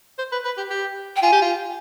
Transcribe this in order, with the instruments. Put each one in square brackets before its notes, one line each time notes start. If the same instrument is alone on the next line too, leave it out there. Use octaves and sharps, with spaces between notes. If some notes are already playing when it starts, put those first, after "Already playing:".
[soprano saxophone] C5
B4
B4
G4
G4
[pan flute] G5
[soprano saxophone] F4 [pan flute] G#5
[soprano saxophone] G4
F4